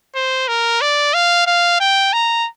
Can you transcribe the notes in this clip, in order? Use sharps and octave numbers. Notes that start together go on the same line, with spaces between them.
C5
A#4
D5
F5
F5
G5
A#5